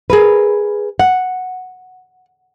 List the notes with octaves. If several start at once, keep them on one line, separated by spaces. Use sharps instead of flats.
G#4 A#4 B4
F#5